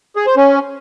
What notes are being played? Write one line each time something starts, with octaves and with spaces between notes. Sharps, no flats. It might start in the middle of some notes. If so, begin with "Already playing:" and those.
G#4
C5
C#4